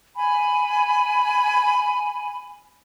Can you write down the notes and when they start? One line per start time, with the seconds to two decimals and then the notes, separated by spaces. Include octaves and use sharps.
0.16 G#5 B5